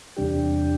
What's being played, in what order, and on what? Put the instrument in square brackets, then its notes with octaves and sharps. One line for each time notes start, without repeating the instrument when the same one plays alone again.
[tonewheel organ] E2 C3 G3 D4 G4